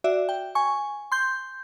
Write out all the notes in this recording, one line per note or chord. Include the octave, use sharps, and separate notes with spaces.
F#4 D5 E5
G5
G#5 C#6
C6 G6